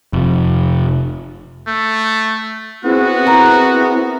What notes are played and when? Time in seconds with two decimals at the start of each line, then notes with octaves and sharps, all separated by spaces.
0.13 F1
1.67 A3
2.84 B3 C4 E4 F#4 G#4
3.27 A#4